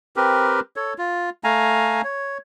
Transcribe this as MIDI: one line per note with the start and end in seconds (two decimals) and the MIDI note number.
0.16 0.60 60
0.16 0.60 67
0.16 0.60 70
0.16 0.60 71
0.76 0.94 69
0.76 0.94 73
0.98 1.30 65
1.44 2.01 57
1.44 2.01 77
1.44 2.01 80
1.44 2.01 82
2.04 2.38 73